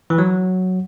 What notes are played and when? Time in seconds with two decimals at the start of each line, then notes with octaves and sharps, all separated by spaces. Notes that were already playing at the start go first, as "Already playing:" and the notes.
0.10 E3
0.18 F#3